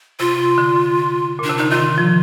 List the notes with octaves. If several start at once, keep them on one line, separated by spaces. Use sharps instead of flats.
C3 F4
D3
A#2 D4
C3
D3 D#4
D#3 F4
F3